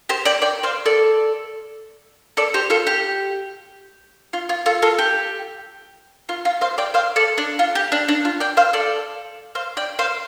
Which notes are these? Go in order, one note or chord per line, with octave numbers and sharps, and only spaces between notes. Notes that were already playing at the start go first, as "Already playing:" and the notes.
G4 C5
D5 G5
D5 G5
C5 F5
A4 D5
A4 D5
G4 C5
F4 A4
G4
F4
F4
F4 A4
F4 A4
G4
F4
F4
C5 F5
D5 G5
C5 F5
A4 D5
D4
F4
G4
D4
D4
F4
D5 G5
C5 F5
A4 D5
C5 F5
D5 G5
C5 F5